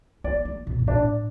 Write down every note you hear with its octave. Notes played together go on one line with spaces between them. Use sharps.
B3 D5
A3
B2
G2
A2 D4